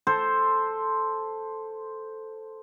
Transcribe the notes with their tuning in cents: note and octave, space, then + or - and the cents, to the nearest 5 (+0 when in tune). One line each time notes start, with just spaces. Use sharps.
A4 +0 C5 +0